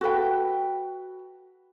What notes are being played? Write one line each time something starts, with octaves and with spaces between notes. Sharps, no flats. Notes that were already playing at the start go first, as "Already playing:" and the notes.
F#4 A4 B4 G5